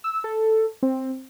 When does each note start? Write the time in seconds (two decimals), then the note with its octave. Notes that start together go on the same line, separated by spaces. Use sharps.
0.04 E6
0.24 A4
0.83 C4